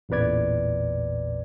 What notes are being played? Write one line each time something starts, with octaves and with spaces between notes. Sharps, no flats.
A1 E2 A#2 B4 D5 G#6